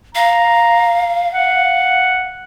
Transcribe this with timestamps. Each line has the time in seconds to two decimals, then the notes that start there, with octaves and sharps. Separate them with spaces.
0.15 F5 A#5
1.33 F#5